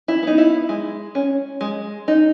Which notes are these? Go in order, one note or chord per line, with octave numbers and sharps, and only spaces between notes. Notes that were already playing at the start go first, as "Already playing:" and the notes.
E4
B3 D#4
E4
G#3
C#4
G#3
D#4